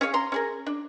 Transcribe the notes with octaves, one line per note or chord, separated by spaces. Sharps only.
C#4 G#4 C#5 F5
A#5 C6
C#4 G#4 A#4
D4